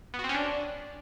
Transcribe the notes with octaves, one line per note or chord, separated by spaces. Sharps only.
B3
F#4
C4
C#4
D4